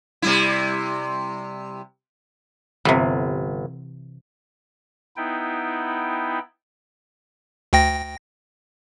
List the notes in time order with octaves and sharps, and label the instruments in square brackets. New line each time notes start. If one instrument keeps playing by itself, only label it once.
[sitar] C3 G3 E4
[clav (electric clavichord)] G1 [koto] C3 E3
[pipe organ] B3 D#4 E4 G5
[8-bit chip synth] D2 G5 A#6